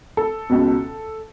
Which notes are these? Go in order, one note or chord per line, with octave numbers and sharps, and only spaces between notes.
A4
C#2 B2